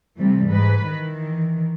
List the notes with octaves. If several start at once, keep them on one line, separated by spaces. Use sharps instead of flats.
C3 E3 G3 A3
G#2 B4
D#3 E3